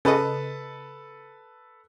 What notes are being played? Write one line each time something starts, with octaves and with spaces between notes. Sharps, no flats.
C#3 A4 B4 D#5